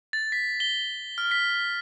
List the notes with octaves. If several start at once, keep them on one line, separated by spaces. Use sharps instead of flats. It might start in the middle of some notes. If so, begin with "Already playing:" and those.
A6
B6
G7
F6
B6